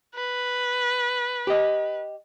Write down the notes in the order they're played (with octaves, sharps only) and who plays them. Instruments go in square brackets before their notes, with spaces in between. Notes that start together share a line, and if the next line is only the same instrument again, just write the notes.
[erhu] B4
[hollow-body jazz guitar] G4 D#5